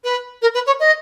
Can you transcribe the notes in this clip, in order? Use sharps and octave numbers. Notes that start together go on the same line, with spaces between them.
B4
A#4
B4
C#5
D#5